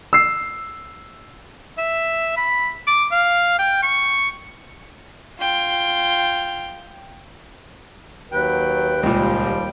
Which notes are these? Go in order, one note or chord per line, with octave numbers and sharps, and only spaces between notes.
E6 C7
E5
B5
D6
F5
G5
C#6
F4 G5
D#2 F#3 B4 G5
C#2 A#2 F3 G3